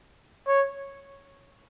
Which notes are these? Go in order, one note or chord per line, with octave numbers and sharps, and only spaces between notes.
C#5